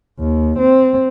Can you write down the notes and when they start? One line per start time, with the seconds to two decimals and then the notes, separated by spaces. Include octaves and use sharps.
0.19 D#2
0.59 C4